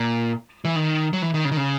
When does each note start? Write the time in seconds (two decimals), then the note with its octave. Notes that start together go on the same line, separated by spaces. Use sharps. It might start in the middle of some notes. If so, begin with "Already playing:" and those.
Already playing: A#2
0.65 E3
0.76 D#3
1.13 F#3
1.22 E3
1.34 D#3
1.45 C#3
1.51 D#3
1.57 C#3